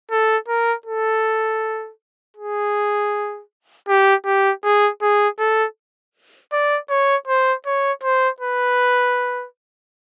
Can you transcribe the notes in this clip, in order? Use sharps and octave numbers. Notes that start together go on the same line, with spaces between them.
A4
A#4
A4
G#4
G4
G4
G#4
G#4
A4
D5
C#5
C5
C#5
C5
B4